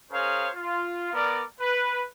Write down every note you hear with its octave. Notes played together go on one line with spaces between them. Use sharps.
C#4 G#4 A#4 C5 C#5 F5
F4
B3 A#4 D5
B4